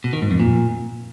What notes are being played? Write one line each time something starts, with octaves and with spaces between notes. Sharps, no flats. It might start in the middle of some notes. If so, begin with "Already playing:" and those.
B2
D#3
G#2
F2
A#2